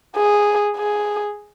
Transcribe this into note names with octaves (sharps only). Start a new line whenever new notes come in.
G#4
G#4